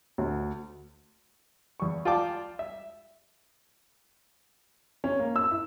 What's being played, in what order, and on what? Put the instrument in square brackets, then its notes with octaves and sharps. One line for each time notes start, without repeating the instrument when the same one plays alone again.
[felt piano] D2
[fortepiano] E2 C#6
F4 D5 G5 A5 D6
E5
[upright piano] C#4
A#3
E6
E4